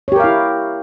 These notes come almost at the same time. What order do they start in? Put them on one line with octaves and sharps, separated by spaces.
C#5 G4 A#4 F5 E4